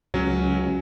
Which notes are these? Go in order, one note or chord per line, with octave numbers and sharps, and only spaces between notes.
C#2 F#3 C#4